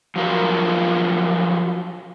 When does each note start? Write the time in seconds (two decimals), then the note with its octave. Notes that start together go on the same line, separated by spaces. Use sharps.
0.16 F3 F#3 F4 A#4